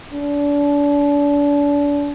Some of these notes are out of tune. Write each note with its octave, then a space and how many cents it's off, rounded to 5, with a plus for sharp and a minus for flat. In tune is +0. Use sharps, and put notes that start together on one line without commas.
D4 -35